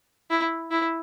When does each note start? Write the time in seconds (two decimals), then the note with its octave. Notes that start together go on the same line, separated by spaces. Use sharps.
0.30 E4
0.71 E4